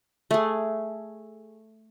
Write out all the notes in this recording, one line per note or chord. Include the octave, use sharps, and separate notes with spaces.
A3 G#4